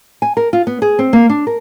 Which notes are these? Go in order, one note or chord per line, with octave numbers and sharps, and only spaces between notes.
G#5
A#4
F4
B3
G#4
C4
A#3
D4
A#4